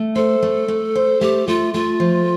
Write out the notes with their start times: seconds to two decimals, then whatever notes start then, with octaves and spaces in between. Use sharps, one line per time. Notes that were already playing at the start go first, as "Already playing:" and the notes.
Already playing: A3
0.16 A4 C5
0.43 A3
0.68 A3
0.95 C5
1.21 A3 G4
1.48 A3 F4
1.74 A3 F4
2.00 F3